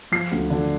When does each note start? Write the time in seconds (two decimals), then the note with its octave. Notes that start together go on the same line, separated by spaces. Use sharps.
0.12 F3 C7
0.32 D2
0.50 D3